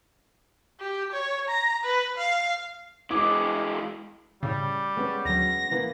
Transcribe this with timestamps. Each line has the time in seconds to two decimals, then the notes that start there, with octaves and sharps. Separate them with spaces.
0.80 G4
1.13 C#5
1.49 A#5
1.84 B4
2.18 F5
3.11 E3 G#3 D6
4.43 A2 C#3 G3
4.97 G#3 B3 C#4
5.25 D2 F#3 A#6
5.71 E3 A#3 B3